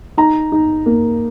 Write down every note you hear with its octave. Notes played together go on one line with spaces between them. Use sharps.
D#4 A#5
D#4
A#3